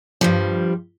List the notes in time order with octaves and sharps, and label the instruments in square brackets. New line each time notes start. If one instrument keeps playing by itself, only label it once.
[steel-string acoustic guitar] G2 F3 G3